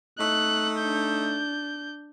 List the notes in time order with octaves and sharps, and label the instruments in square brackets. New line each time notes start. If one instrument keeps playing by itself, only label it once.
[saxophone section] A3 D#4 [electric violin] F#6
[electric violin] D4 G6